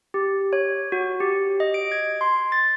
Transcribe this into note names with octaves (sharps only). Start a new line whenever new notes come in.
G4
C#5
F#4
G4
D#5
D7
G#6
C6
A6